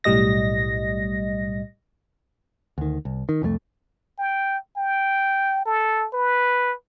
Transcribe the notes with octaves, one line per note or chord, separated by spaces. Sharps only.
B1 A2 G3 D#5 A#6
D2 D#3
C2
D#3
C2 F2 E3 A3
G5
G5
A4
B4